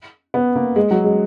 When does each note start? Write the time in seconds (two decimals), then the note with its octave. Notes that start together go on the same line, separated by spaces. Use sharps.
0.34 B3
0.56 A#3
0.76 G#3
0.91 F#3
1.04 G#3